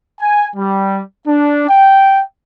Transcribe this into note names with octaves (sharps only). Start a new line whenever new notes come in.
G#5
G3
D4
G5